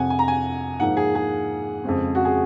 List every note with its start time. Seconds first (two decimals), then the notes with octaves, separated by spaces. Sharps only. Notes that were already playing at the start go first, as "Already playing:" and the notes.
Already playing: F2 C3 F3 C4 F#5 G#5
0.10 G#5
0.19 A#5
0.28 G#5
0.80 G#2 F3 A#3 D#4 F#5
0.97 G#4
1.15 G#4
1.84 F2 C#3 G#3 C4
2.15 F#4
2.25 G#4